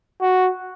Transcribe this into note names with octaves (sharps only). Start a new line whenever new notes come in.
F#4